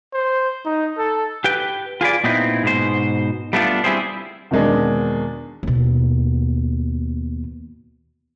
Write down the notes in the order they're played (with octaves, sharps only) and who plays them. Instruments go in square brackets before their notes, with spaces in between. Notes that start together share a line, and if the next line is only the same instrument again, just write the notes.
[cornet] C5
D#4
A4
[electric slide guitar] G4 B4 G5
F4 G#4 B4 D5
A#2 B3 C4 D#4 E4
G#2 B2 C5
G3 A3 B3 D4 F4
G3 C4 E4 G4 G#4 C5
[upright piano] E2 B2 D#3 G#3 C4 D4
[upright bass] D#2 B2